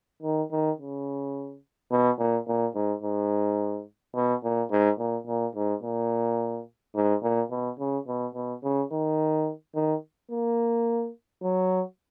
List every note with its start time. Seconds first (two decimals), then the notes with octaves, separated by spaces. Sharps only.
0.22 D#3
0.51 D#3
0.78 C#3
1.91 B2
2.18 A#2
2.47 A#2
2.75 G#2
3.03 G#2
4.15 B2
4.43 A#2
4.70 G#2
4.98 A#2
5.27 A#2
5.55 G#2
5.82 A#2
6.95 G#2
7.22 A#2
7.50 B2
7.79 C#3
8.07 B2
8.34 B2
8.63 C#3
8.91 D#3
9.75 D#3
10.31 A#3
11.42 F#3